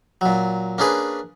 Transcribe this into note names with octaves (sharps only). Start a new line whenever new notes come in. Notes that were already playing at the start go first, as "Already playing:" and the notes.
A#2 F#3
A#3 C#4 D4 G#4 B4